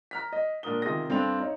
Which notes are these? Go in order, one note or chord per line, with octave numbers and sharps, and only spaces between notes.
A#5 F6 B6
D#5
A#2 D4 A#4 D#6 G7
C3 D#3 F4 G#4 D#6 A#6
G2 C4 D4 A4 G5 F7
D#4 C#5